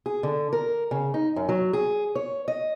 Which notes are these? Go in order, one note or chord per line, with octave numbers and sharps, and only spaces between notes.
G#4
D3
A#4
C#3
D#4
F#2
F#3
G#4
C#5
D#5